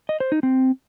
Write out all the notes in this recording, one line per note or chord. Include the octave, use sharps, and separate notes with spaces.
D#5
C5
D#4
C4